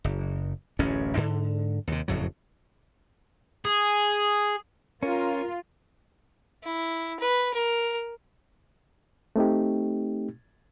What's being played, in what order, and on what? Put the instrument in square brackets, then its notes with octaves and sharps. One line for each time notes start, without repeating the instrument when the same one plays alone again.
[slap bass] F#1
D1 A1 F#2 C#4
G#2 D3
D#2 C3
F#1 F2 A2 F#3
[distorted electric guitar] G#4
[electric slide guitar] C#4 [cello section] F4 [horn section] A#4
[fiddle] E4
B4
A#4
[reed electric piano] A3 C4 D#4 G4